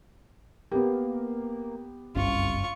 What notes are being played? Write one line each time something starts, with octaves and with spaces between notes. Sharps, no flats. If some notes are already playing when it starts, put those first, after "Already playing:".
A#3 B3 G4
F#1 C2 G2 C#4 F4 C#6